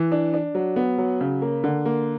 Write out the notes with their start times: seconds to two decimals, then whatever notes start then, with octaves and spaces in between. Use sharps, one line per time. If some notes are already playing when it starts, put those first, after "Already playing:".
Already playing: E3
0.12 D4
0.34 D4
0.55 F#3
0.76 B3
0.98 F#3
1.21 C#3
1.42 A#3
1.64 D3
1.85 A#3